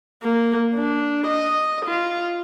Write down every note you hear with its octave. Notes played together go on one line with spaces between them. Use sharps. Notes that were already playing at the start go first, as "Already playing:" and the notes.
A#3
D4
D#5
F4